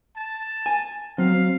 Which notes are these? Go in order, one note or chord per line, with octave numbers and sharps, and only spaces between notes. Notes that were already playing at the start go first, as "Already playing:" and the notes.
A5
G#5
F#3 C4 F5